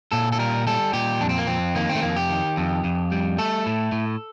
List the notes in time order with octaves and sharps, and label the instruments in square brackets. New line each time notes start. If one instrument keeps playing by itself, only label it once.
[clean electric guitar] A#2 A4
A4
G3 A#4
G3 A4
A#2 G4
F2 D4
C4
A#3
F2 C4
D#3 A#3
C4
A3
F2 A#3
G4
D#3
F2
F2
G3
A3 A4
A2
A2